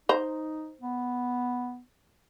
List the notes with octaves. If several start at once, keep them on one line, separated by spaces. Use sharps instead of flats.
D#4 C5 A#5
B3